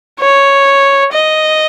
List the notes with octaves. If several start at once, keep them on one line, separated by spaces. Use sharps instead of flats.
C#5
D#5